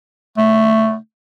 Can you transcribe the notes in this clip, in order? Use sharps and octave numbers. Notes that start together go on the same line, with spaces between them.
A3